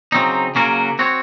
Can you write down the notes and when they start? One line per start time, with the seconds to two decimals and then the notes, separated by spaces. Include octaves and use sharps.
0.12 C#3 F#3 C4 D#4
0.55 C#3 F#3 A#3 C#4 F#4
0.99 C4 F#4 C#5